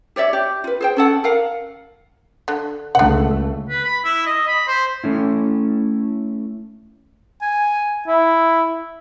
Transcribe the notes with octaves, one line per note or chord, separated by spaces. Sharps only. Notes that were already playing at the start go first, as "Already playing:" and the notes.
G4 C#5 D5 E5
G4
F4 B4
G#4 C5 G5
C#4 A4 F#5
A#4 F5 F#5
D3
C#2 D3 A3 D4 F#5
B4
B5
E4
D#5
B5
C5
A3 C#4 E4
G#5
E4